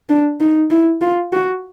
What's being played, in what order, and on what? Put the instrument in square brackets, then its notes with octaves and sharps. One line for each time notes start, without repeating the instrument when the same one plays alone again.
[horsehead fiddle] D4
D#4
E4
F4
F#4